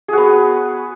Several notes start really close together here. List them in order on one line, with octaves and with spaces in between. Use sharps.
G#4 F#4 B3